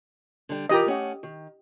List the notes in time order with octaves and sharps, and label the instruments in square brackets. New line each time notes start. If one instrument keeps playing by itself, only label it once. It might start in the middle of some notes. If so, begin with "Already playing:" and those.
[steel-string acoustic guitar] D3 G3
[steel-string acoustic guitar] E3 F4 A#4 [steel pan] G4 D#5
[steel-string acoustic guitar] A3 C#4 F#5
D#3